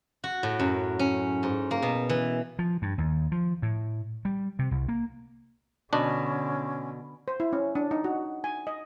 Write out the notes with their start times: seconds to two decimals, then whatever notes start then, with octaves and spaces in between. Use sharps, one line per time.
0.24 F#4
0.43 A2
0.60 F#2
0.99 C#4
1.43 G#2
1.71 A#3
1.82 B2
2.09 E3
2.59 F3
2.82 G2
2.98 D#2
3.32 F3
3.62 A2
4.25 G3
4.59 C3
4.71 C2
4.88 A#3
5.93 B2 D3 C#4 D4
7.28 C5
7.40 E4
7.53 C#4
7.75 D4
7.91 D#4
8.04 F#4
8.44 G#5
8.67 D#5